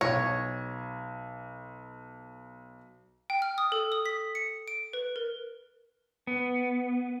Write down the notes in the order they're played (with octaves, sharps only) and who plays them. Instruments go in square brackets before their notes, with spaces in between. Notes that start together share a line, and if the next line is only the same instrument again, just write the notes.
[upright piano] B1 A#6 [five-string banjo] C#5
[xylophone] G5
F6
D#6
A4
D#6
B6
C#7
D7
B4
A#4
[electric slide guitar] B3